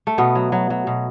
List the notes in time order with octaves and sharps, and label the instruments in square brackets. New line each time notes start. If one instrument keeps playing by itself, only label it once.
[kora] A3
B2 B3
F#3
F#3
F#3
B2